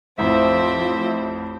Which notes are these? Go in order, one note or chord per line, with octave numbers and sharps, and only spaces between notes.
A1 F2 A2 F3 C4 C5 E5